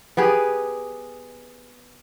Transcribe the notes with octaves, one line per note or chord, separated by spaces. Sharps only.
B3 G4 G#4